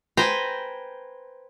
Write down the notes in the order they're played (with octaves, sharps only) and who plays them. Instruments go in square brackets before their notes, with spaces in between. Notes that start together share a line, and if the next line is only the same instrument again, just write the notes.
[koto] B4 C5 G5 G#5 A#5